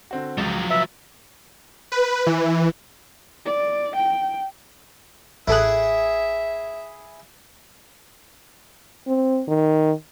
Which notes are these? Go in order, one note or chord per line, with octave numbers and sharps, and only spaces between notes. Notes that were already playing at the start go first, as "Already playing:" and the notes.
D3 C4 F#4
C#2 F3 F#3
B4 E5
B4
E3
D5
G5
A1 E4 G#4 A4 E5 F#6
C4
D#3